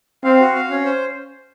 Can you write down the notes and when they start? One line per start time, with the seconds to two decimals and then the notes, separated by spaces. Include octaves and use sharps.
0.24 C4 F5
0.40 F#4
0.55 F5
0.70 C#4
0.85 C5